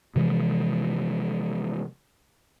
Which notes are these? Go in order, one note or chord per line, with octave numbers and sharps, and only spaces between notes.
C3 E3 F3 G#3